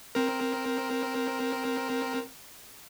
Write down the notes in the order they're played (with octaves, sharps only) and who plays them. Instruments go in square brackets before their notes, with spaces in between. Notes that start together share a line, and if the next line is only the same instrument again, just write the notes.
[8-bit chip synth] C4 A#4